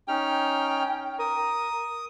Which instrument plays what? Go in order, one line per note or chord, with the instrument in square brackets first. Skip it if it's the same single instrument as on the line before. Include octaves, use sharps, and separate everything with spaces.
[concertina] C#4 D#4 F6 [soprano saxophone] G5
[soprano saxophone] A#4 [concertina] D#6